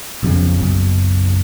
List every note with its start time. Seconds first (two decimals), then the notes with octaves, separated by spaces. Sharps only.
0.23 B1 F2 C#3
0.57 F#1 B1